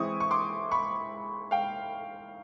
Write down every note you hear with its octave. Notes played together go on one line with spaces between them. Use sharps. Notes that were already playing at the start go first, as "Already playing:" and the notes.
Already playing: E3 G#3 C4 E4 C#6 D#6
C#6
C6 D6
B5 C#6
F5 G5